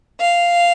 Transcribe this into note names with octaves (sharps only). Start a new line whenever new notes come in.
F5